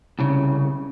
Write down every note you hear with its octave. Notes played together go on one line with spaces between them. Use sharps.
C2 C#3